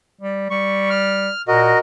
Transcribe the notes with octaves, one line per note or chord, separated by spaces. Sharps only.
G3
G3 C#6
F6
A#2 F#4 A#4 D#5